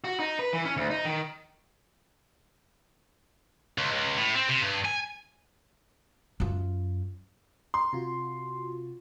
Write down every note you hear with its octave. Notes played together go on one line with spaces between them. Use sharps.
F#4
D#4
B4
E3
C#4
D2
D#4
D#3
C#2
C#2
A2
C4
C3
G2
G#5
F#2 F4
C6
C3 F4 F#4